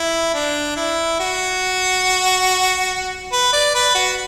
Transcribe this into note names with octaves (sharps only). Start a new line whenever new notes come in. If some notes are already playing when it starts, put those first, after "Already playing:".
Already playing: E4
D4
E4
F#4
B4
D5
B4
F#4